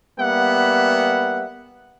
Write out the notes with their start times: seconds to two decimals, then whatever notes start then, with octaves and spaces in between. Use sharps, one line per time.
0.19 G3 A#3 B3 E5 F#5